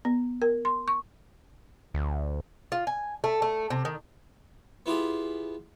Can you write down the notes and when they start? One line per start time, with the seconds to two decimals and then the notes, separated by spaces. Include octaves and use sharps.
0.05 B3
0.42 A#4
0.65 C6
0.88 C#6
1.94 D2
2.72 F4
2.87 G#5
3.24 A3
3.42 A3
3.70 C3
3.85 D#3
4.86 B3 E4 F4 G4 G#4